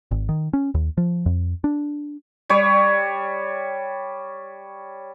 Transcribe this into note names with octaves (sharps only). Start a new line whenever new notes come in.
G#1
D#3
C#4
D#2
F3
F2
D4
G3 C#5